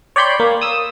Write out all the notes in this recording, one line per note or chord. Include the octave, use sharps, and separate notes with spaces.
C#5 D5 G5 B5 C6 G6
A#3
D#6 E6